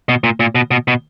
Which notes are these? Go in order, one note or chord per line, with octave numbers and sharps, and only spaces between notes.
B2
A#2
A#2
B2
B2
B2